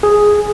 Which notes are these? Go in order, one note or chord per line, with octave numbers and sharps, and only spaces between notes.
G#4